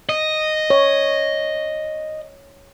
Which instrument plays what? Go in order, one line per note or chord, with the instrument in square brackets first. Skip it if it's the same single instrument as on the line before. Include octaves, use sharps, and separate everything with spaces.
[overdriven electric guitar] D#5
[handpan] C#5